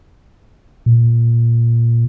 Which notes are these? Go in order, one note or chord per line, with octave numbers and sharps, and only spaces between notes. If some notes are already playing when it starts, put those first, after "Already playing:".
A#2